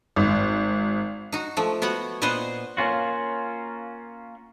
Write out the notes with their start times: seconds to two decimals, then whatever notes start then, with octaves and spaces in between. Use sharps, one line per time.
0.16 G#1
1.32 D#4 F#4
1.57 F3 A3
1.82 B3 F#4 C#5 F#5
2.22 A#2 B3 B4 C5 D#5 F#5
2.77 A#3 C#4 F4 F#4